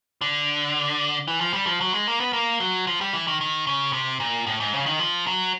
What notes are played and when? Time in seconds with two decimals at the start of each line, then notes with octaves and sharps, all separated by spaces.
0.21 D3
1.28 E3
1.41 F3
1.54 G3
1.67 F3
1.81 F#3
1.94 G#3
2.08 A#3
2.20 B3
2.33 A#3
2.60 F#3
2.87 F3
3.01 G3
3.13 E3
3.28 D#3
3.41 D#3
3.67 C#3
3.93 C3
4.20 A#2
4.47 A2
4.60 G#2
4.74 C#3
4.86 D#3
5.00 F3
5.27 F#3